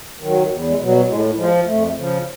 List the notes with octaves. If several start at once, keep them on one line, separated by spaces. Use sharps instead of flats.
D#3 F#3
E2
G#3
B2 F#3
G3
A2 G#3
F3 G#3
F2 A3
C#3 F3